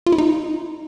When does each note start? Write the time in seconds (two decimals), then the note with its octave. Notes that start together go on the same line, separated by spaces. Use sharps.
0.06 F4
0.12 E4
0.18 D#4